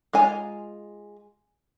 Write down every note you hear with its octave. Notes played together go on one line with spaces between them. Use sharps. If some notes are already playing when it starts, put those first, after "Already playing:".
G#3 F4 G#5 A#5